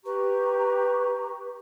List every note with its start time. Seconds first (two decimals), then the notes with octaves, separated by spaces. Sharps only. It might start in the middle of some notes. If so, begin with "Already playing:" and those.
0.05 G4 B4 A#5 C#6